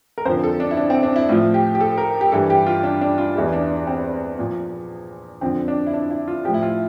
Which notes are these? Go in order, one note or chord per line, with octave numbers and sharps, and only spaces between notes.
A#4
F2 D3 F3 C5
A4
D4
E4
D4
C4
D4
E4
A2 F3 F4
G4
G4
A4
A#4
G4
G2 E3 G3 A4
G4
F4
D4
D4
F4
E2 E3 G3
D4
C4
A#2 F3
F2 D3 F3 C4
D4
E4
D4
E4
F4
A2 F3 G4
E4
F4